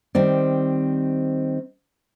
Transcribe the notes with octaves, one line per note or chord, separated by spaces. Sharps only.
D#3 G3 C4 D5